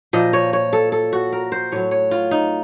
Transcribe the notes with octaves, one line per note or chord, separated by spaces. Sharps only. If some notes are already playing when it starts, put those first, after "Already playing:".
A#2 F3 D#5
C#5
C#5
A4
A4
F#4
A#4
C5
A2 F#3 C#5
C#5
F4
D#4